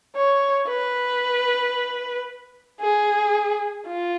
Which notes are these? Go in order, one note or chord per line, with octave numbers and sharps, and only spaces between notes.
C#5
B4
G#4
F4